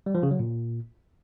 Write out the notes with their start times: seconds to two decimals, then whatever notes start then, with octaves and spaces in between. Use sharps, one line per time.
0.06 G3
0.15 F3
0.23 C#3
0.31 F#3
0.39 A#2